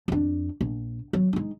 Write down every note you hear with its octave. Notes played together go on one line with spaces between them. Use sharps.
F2 D4
A#1
F#3
G#3 D#4